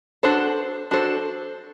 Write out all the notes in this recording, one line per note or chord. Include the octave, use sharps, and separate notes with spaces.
D4 F#4 A4 C5
D4 F#4 A4 C5